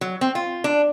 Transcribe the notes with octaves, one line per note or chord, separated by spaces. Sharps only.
F#3
C4
F4
D4